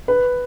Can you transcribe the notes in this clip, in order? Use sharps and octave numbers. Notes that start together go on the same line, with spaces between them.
B4